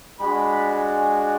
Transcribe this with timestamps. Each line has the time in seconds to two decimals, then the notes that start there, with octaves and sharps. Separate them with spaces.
0.20 G#3 D4 F#4 B5
0.72 G#5